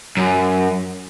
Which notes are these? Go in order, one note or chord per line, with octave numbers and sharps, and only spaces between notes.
F#2